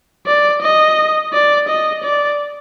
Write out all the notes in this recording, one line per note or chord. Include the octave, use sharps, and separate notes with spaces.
D5
D#5
D5
D#5
D5